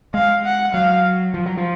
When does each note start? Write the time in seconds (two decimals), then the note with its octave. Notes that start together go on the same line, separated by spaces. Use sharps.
0.14 G#3 F5
0.45 F#5
0.74 F#3 F5
1.34 F3
1.46 F#3
1.57 F3